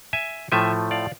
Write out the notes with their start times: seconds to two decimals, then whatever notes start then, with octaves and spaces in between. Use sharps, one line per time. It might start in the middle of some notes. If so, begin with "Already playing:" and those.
0.13 E5 G#5
0.52 A2 F3 A3 E5 G#5
0.91 D5 F5